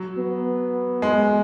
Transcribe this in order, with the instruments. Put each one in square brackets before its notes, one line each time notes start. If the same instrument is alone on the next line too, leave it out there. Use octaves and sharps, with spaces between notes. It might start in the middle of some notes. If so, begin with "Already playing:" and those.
Already playing: [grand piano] F#3
[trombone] B3
[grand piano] G#3